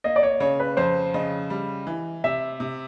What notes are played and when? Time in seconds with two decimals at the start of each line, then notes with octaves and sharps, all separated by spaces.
0.04 A#3 D#5
0.16 D5
0.23 C#5
0.40 C#3 C#5
0.60 B4
0.77 F2 C5
1.14 C#3 D#5
1.50 G3
1.87 E3
2.24 C3 E5
2.60 C3